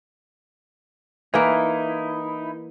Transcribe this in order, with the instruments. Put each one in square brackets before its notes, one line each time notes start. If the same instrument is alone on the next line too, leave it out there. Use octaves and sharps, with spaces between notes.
[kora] E3 A#3 [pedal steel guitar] D#4 E4